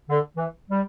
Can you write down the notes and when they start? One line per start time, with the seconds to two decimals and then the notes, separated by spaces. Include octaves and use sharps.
0.09 D3
0.36 E3
0.70 G3